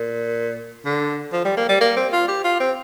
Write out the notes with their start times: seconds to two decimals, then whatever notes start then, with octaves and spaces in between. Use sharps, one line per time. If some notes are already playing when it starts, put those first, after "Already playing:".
Already playing: A#2
0.85 D3
1.33 F3
1.45 G3
1.57 A#3
1.69 G3
1.81 A#3
1.96 C4
2.12 F4
2.28 G4
2.44 F4
2.60 C4